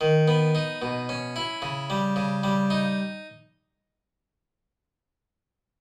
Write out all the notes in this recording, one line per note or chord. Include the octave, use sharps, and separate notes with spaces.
D#3
B3
D#4
B2
C#4
E4
C#3
G3
C#3
G3
D#4